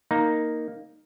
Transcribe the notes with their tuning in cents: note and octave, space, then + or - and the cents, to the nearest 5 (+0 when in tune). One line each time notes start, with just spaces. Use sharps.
A#3 +0 D#4 +0